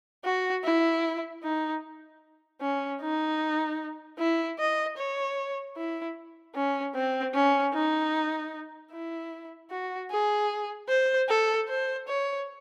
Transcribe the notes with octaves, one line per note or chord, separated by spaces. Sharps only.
F#4
E4
D#4
C#4
D#4
E4
D#5
C#5
E4
C#4
C4
C#4
D#4
E4
F#4
G#4
C5
A4
C5
C#5